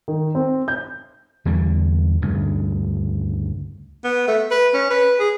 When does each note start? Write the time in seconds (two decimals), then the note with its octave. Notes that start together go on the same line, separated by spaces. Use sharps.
0.08 D#3
0.35 C4
0.68 G6
1.45 E2 D3 G3
2.22 D2 G2 C#3
4.04 B3
4.27 A3
4.51 B4
4.74 C#4
4.90 B4
5.19 G#4